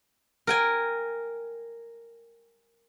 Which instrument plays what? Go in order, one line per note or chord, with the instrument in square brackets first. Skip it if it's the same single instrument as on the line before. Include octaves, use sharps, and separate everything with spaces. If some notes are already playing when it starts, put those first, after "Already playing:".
[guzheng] A#4 G5 G#5